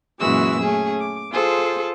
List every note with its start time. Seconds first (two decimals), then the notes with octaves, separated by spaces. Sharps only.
0.19 F#2 A#2 E3 G#3 F#4 E6
0.61 A3 C#4 G#4
0.99 D6
1.32 F4 G#4 A4 C5